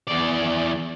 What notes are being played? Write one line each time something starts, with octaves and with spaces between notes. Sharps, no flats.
E2 D5